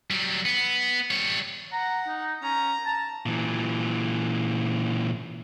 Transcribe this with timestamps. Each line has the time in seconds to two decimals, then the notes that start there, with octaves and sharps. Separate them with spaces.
0.11 F#3 G3
0.46 B3
1.11 G3 C#5
1.73 F#5 A#5
2.08 D#4
2.43 C#4 A#5
2.86 A5
3.26 A#2 E3